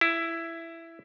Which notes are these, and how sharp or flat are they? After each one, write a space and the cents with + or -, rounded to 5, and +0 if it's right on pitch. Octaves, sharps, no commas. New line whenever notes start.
E4 +10